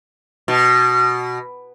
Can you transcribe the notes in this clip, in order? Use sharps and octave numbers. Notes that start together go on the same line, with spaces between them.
B2